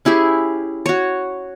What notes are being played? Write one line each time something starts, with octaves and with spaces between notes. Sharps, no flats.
C#4 E4 G4 G#4
F#4 C#5